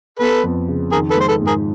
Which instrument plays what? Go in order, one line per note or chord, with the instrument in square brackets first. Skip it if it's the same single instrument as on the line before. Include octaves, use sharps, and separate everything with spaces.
[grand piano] B3 [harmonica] A4 B4
[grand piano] F2
C#3
[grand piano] D#3 [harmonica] G#4 A#4
[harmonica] A4 B4
[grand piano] G#3 [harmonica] C5
[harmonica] A4 B4
[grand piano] G#2
[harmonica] G#4 A#4